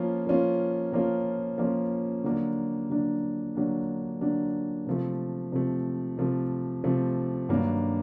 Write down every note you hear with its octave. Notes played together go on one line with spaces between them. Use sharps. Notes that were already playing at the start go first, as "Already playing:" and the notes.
Already playing: F3 A#3 C#4 F4
F3 A#3 C#4 F4
F3 A#3 C#4 F4
F3 A#3 C#4 F4
D3 F#3 A#3 D4
D3 F#3 A#3 D4
D3 F#3 A#3 D4
D3 F#3 A#3 D4
C3 F3 A3
C3 F3 A3
C3 F3 A3
C3 F3 A3
G2 D#3 F#3 A#3 D4